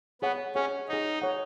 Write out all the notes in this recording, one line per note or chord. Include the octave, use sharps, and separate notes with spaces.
B3 G#4 C#5 F#5
C#4 G#4 C#5 F#5
D#4 G#4 C#5 F#5
G#4 C#5 F#5